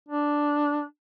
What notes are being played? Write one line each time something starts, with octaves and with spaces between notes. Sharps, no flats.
D4